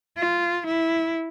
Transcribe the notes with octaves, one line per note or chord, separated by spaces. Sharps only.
F4
E4